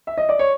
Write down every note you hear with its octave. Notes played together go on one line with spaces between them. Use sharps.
E5
D#5
D5
C#5